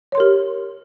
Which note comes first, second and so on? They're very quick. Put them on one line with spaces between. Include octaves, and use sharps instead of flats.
C#5 C6 A#4 G4